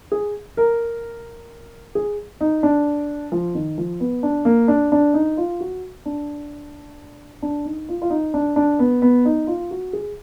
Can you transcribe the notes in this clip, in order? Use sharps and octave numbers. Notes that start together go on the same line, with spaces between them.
G#4
A#4
G#4
D#4
D4
F3
D#3
F3
B3
D4
A#3
D4
D4
D#4
F4
F#4
D4
D4
D#4
F4
F4
D#4
D4
D4
B3
B3
D#4
F4
F#4
G#4